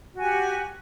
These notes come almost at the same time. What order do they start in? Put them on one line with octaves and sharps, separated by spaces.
F#4 G#5 G4 F#5